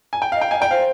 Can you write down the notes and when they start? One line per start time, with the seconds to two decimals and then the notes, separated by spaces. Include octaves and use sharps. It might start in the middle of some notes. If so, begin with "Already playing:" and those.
0.13 G#5
0.22 G5
0.32 F5
0.36 D#5
0.41 G5
0.51 D#5 G#5
0.60 D5 G5
0.71 C5 F5